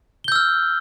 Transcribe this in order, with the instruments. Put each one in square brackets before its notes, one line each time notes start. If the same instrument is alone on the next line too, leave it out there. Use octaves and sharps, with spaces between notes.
[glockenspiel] G7
G6
E6
F6